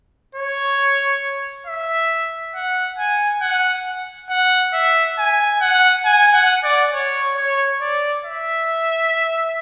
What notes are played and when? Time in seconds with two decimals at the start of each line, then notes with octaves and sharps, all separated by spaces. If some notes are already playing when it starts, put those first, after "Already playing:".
0.35 C#5
1.67 E5
2.55 F#5
2.98 G#5
3.42 F#5
4.30 F#5
4.73 E5
5.18 G#5
5.61 F#5
6.05 G#5
6.34 F#5
6.64 D5
6.93 C#5
7.37 C#5
7.81 D5
8.24 E5